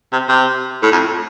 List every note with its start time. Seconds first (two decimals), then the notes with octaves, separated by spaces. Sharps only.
0.12 C3
0.29 C3
0.83 A2
0.92 F2